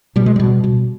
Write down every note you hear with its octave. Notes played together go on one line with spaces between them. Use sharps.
B2 G3
G#3
B2 G3
B2